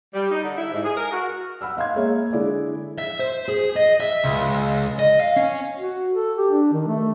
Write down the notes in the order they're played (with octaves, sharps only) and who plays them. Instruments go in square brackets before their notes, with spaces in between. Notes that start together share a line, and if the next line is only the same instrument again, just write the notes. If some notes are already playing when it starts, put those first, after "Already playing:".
[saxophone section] G3
D#4
D3
E4
G#2
G#4
A#4
F#4
[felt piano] F#5 B5 E6 F6
D#5 F5 C6 G#6
G#3 A#3 G#4 C#5 E5 F5
D3 G#3 E4 G#4 D5
[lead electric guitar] E5
C5
G#4
D#5
E5
C#2
D#5
F5
C#4
[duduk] F#4
A4
G4
D4
D#3
A3